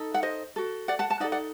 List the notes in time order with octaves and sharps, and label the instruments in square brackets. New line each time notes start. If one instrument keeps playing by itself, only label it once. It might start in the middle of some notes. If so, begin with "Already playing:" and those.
Already playing: [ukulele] D#4 A4
F#5
C5 D#5
F#4 A4
D5 F#5
F#5 A5
F#5 A5
D#4 D5 F#5
A4
D5 F#5